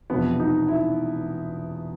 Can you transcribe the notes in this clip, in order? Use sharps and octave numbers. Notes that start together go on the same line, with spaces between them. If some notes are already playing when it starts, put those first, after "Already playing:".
E1 E2 C3 F3 B3
D#4
E4